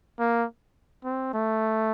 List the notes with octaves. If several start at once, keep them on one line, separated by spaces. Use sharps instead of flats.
A#3
C4
A3